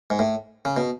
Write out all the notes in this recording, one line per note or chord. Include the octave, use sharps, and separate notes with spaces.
G#2
A2
C#3
B2